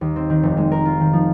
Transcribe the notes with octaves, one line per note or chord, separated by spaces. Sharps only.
D#2
C4
D#3
F1
G#3
A#4
F4
D#3
F3